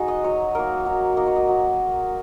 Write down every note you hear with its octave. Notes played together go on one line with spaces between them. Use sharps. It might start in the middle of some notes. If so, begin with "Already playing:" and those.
Already playing: G#3 D#4 F#4 G#4
D#5
F#3 C#5
A#3 D#4 A#4
F#3 C#5
A#3 D#4 D#5
C#5
D#5
F#3